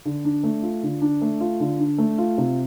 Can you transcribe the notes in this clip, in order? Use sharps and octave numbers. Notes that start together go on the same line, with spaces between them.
D3
D4
A3
F4
D3
D4
A3
F4
D3
D4
A3
F4
C3